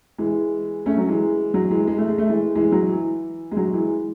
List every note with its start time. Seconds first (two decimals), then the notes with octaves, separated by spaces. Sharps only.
0.18 E3 G#3
0.86 A3 C#4
0.97 F#3
1.09 E3 G#3
1.54 F#3
1.71 E3 G#3
1.88 G#3
1.98 A3
2.08 G#3
2.18 A3
2.29 E3 G#3
2.55 E3 G#3
2.72 F#3
2.89 E3
3.52 G#3
3.57 F#3
3.73 E3 G#3